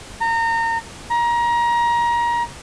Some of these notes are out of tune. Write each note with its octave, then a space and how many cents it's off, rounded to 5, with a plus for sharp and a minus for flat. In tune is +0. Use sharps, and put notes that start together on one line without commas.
A#5 -30
A#5 +25